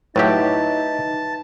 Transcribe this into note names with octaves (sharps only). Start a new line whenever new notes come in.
A2 F#3 D#4 G4 B4 E5 A5